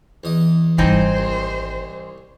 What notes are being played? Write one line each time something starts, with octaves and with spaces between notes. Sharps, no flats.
E2 D#5
G#1 E3 G3 C4 D#4 C5
C2